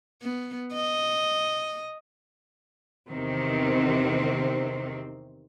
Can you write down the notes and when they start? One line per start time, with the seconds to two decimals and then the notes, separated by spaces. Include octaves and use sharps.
0.22 B3
0.74 D#5
3.11 E2 C3 D#3 C4